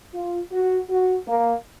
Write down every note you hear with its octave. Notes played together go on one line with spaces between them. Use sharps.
F4
F#4
F#4
A#3